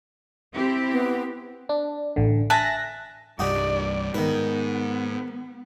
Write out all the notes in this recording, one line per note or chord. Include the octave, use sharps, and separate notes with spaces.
C4 E4 G4
B3
D4
A1 D3
E5 G#5 A5 F#6 A#6
C2 G2 D#4 F#4 G4 D5
G#2 D#3 B3 B4